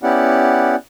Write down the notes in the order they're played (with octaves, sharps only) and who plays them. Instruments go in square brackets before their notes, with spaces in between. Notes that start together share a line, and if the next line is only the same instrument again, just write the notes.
[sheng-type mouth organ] B3 C#4 E4 G4 D5 F#5